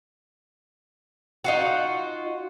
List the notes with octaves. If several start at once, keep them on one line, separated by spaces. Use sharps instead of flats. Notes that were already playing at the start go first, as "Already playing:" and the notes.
D#4 F4 F#4